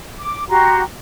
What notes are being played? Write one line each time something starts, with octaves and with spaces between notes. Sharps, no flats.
D6
F#4 G4 A#5 C6